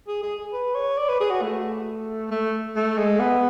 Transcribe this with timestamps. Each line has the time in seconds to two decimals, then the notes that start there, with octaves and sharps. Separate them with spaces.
0.07 G#4
0.22 G#4
0.53 B4
0.75 C#5
0.97 D5
1.09 B4
1.20 G#4
1.30 F#4
1.42 A3
2.31 A3
2.76 A3
2.98 G#3
3.19 B3